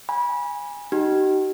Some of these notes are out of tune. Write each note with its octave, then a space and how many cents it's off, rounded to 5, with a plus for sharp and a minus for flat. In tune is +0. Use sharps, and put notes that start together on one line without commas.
G#5 -15 B5 -30
D#4 -10 G4 -45